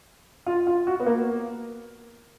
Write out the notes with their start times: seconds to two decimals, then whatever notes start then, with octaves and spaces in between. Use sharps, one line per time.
0.46 F4
0.67 F4
0.87 F#4
1.00 B3
1.06 A#3